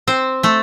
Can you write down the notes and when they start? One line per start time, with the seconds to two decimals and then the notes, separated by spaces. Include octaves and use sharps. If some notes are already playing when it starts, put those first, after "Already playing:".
0.07 C4 C5
0.43 A3 A4